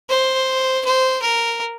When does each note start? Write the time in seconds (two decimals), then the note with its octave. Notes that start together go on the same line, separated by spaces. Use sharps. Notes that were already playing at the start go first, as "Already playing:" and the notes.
0.10 C5
0.85 C5
1.22 A#4